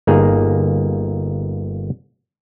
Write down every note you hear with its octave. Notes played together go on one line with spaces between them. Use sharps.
G1 A#3 D#4 G#4